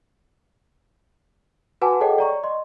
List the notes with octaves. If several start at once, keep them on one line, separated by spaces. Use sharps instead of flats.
F#4 B4 F#5 G#5 A5 D6
G#4 A4 C#5 D#5 F#5 G5
D5 A#5 C#6
D#5 C6